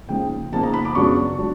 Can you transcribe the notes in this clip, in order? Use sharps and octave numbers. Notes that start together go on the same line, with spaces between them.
C#3 F3 A#3 D#4 G5
C#3 F3 A#3 D#4 A5
A#5
B5
D6
F#2 C#3 F#3 B3 D4 C#6
F#3 D4